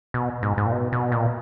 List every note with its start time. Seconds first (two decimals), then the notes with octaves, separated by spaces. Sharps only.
0.14 B2
0.43 G#2
0.58 G#2
0.66 A#2
0.72 B2
0.93 B2
1.12 A#2